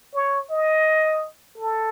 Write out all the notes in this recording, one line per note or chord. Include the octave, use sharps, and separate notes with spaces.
C#5
D#5
A4